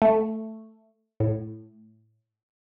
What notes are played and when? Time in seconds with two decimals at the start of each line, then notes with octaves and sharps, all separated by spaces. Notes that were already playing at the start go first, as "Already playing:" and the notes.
0.02 A3
1.20 A2